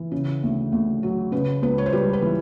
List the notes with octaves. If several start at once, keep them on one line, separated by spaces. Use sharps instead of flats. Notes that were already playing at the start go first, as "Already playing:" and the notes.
Already playing: E3
C#3
D2
D2
F#3
C#3 B4
C#2 B4
C#5
C5
G3 B4
B4
E3